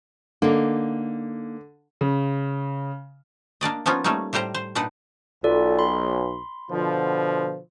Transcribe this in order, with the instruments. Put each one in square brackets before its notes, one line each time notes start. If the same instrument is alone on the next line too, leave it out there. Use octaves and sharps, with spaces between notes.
[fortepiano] D3 [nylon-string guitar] A#3 D#4
[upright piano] C#3
[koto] A#3 D4 D5 D#5
F3 A#3 B3 C#4 D#4 F4
G3 A3 A#3 C#4 D#4
A2 G3 G4 C5 A#5
C5
A#2 D4 D#4 B4 F#5
[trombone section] B1 [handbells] F4 A4 D5
[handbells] B5 C6
[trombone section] B2 D3 F3